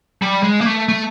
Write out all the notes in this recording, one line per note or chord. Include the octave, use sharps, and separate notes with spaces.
G3
G#3
A#3
A3
A3